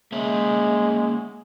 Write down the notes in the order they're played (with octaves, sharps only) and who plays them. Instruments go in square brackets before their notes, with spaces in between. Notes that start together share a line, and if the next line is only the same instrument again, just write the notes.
[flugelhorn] G#3 [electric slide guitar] A#3 C#4 E5